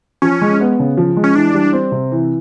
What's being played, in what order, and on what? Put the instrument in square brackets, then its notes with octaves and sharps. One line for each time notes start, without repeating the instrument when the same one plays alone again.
[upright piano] F3 [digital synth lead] C#4
[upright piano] G#3
B3
C#3
F3
G#3
[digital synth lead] C#4
[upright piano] E3 [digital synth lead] D4
[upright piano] G3
C4
C3
E3